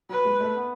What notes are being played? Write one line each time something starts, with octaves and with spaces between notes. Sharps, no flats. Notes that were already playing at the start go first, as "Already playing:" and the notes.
F#3 B4
G#3
A3
B3